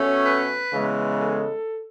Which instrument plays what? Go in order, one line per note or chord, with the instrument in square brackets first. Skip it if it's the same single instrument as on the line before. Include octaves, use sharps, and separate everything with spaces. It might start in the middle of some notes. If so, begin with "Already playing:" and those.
Already playing: [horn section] B2 A3 C#4
B4
C#3 E3 G#3 B3
A4